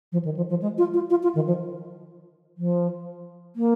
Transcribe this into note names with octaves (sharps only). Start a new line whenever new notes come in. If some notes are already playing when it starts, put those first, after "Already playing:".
F3
D#3
F3
F3
G#3
F4
F4
F4
F4
D#3
F3
F3
A#3